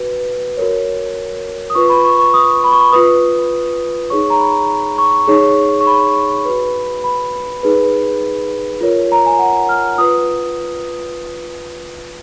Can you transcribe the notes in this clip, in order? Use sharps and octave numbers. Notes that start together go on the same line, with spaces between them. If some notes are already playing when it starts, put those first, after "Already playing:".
Already playing: F#4 B4
F#4 A#4 C#5
D#6
F4 B4 C#6
B5
C#6
C#6
D#6
B5
C#6
B5
F4 B4 D#6
D#4 G#4 C#5 C#6
A#5
B5
C#6
D#4 G#4 C#5
C#6
B5
F#4 B4
B5
D#4 G#4 B4
F4 A#4 C#5
A#5
G#5
F#5
F6
F4 B4 D#6